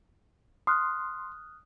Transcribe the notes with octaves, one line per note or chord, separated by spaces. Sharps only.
C6 D#6 F6 F#6